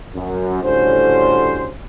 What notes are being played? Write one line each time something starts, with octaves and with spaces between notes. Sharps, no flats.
F#2
A2 D3 G3 C#4 F#4 C5